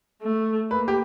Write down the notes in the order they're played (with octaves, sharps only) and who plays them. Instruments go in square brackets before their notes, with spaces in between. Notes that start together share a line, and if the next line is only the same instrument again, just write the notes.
[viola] A3
[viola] A#3 [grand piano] B4
[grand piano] G4